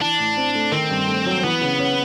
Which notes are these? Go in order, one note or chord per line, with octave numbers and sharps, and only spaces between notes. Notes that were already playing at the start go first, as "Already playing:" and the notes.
E3 D4
A2
C4
A3
D#3 C4
G2
A3
F#3
E3 B3
C#3
C#4